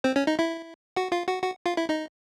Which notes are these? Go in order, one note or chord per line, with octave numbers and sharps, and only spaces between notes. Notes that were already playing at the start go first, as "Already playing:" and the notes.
C4 C5
C#4 C#5
D#4 D#5
E4 E5
F#4 F#5
F4 F5
F#4 F#5
F#4 F#5
F4 F5
E4 E5
D#4 D#5